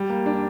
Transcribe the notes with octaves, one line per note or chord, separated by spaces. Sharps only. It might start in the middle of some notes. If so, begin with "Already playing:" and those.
Already playing: G3
A#3
D4